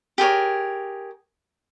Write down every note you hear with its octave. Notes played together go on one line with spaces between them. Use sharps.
G4 G#4 A#4 C#5